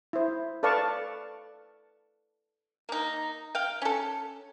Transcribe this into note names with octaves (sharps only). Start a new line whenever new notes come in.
E4 C5
A4 B4 D5 F5 A5 C#6
A#3 D#4
F5 G5
C#4 A4